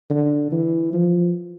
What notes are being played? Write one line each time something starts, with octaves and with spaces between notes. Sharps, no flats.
D3
E3
F3